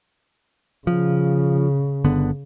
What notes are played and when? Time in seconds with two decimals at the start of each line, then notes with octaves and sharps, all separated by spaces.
0.87 C#3 F3
2.04 G1 D3 B3